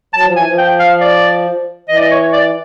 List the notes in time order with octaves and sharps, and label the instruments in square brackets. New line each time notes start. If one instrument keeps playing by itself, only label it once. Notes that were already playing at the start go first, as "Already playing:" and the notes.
[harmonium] F#3 [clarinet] A5
[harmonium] F3
[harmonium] E3 [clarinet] G#5
[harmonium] F3
[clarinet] G5
F5
D5
[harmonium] E3 [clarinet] D#5
[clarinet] D5
D#5
C#5
D5